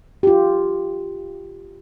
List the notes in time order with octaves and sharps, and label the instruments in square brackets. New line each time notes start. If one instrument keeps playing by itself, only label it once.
[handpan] F4 G4